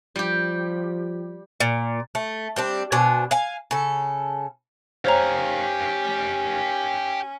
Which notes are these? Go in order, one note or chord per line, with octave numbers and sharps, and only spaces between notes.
F3 G3 G4
A#2
A3
G3 C4 D4
B2 D4 C5 G#5
F5 G#5
C#3 A4
C#4 G4 C5 C#5 F5 A#5